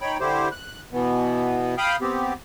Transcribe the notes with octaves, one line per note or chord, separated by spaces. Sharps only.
D#4 C#5 G5 B5
D3 E4 G4 C5
F#6
B2 E3 B3
F5 G5 B5 D#6 F6 G6
B3 C4 G4